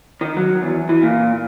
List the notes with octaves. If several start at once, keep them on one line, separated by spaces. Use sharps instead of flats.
D#3
F#3
E2
E3
A#2